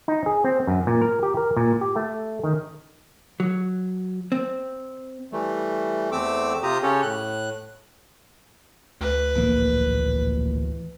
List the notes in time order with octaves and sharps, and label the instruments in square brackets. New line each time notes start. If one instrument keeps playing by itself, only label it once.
[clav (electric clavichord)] D#4
G#4
C4
F#2
A#2
A#4
G4
A#4
A#2
G4
A3
D#3
[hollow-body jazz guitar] F#3
C4
[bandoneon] E3 G3 A3
E2 A3 C4 D6 E6
C3 F4 G4 A#5 D#6
C#3 C#4 G4 A4 C#5
A2 F#6
[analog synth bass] D2 [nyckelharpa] B4
[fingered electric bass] D1 A#1 A#3 [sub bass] E3